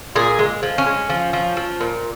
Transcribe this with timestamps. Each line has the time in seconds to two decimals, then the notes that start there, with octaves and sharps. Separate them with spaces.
0.15 A#2 G#4
0.39 G#3
0.63 F3
0.78 C#4
0.86 G#3
1.10 F3
1.33 F3
1.57 F3
1.81 A#2